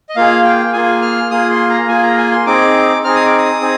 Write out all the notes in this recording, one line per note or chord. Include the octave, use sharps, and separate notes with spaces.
D#5
A#3 F4 G#4 F5
G5
A#3 F4 G#4 G#5
F6
A#3 F4 G#4 D#6
C6
A#5
A#3 F4 G#4 G#5
A#5
G#5
C6
C4 D#4 G#4 D6
C4 D#4 G#4 F6
D#6
D6
D#6
C4 D#4 G#4